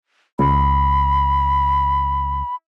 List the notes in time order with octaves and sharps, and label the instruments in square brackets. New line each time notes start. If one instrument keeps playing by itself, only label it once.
[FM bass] C#2 [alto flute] B5